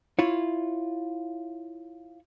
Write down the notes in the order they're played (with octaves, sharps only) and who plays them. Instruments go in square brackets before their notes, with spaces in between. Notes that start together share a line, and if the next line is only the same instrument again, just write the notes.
[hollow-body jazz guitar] E4 F4 C#5